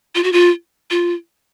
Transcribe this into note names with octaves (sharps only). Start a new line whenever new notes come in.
F4
F#4
F4
F4